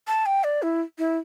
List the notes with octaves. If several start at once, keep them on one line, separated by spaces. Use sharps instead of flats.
A5
G5
D5
E4
E4